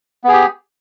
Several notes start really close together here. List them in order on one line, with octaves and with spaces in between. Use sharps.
B3 G#4 G4